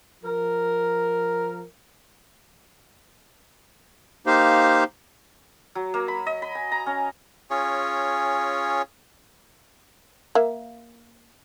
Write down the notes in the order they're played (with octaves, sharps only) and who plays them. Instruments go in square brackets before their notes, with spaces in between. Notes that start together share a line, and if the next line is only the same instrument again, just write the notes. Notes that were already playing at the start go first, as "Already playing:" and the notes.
[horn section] F3 A#4
[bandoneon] A#3 D#4 G4 C5 F5
[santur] F#3
A#3
B5
D#5
B5
G#5
A#5
C#4
[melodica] C#4 F4 G#4 C#5
[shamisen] A#3 E5